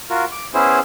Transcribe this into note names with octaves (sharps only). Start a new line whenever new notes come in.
F4 F#4 A#4
D6
B3 C#4 E4 G#4 C5